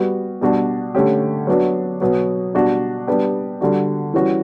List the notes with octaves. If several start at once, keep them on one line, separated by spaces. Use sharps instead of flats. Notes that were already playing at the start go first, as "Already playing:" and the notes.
Already playing: G3 B3 F#4
B2 G3 D4 F#4
D3 A3 C#4 G4
F#3 B3 D4 F#4
B2 F#3 B3 F#4
B2 G3 D4 F#4
G3 B3 D4 G4
D3 G3 D4 F#4
E3 G3 C#4 F#4